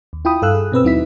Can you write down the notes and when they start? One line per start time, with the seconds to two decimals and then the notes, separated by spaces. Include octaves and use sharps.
0.13 D#2
0.25 E4 F4 G5 B5 D#6
0.42 G2 A4 F5 E6 F#6
0.55 G#4
0.72 B2 C4 B4 E6
0.84 D#2 F#3 D#4 E4 E5 B6